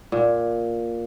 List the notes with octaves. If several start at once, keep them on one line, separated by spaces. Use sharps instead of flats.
A#2